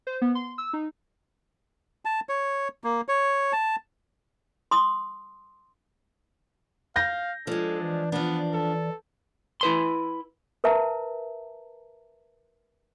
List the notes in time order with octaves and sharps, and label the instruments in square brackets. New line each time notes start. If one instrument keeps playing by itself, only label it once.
[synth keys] C5
B3
C6
E6
D#4
[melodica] A5
C#5
A#3
C#5
A5
[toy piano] C6 D#6
[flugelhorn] F5 [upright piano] G6 A#6
[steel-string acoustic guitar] F3 G#3 [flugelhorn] D4 [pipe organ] A4
[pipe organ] E3 D5
[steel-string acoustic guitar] F3 D4 [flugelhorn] B3
[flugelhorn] A4
[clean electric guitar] E4 B4 C6
[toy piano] A#4 B4 E5 A5 A#5